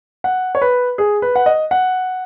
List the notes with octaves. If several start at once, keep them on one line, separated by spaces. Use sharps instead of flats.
F#5
C#5
B4
G#4
B4
F#5
D#5
F#5